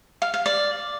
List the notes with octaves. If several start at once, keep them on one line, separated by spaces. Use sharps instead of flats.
F5
F5
D5